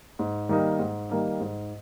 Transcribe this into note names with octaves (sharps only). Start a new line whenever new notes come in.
G#2
D#3 G3 A#3 D#4
G#2
D#3 G3 A#3 D#4
G#2